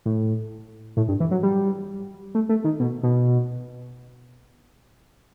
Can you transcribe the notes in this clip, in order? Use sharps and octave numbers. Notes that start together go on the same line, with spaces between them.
A2
A2
G2
E3
F#3
G3
A3
A3
D#3
B2
B2